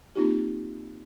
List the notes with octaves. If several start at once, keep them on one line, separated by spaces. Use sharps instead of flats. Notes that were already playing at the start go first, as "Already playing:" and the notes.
A#3 C4 D#4 F4 G4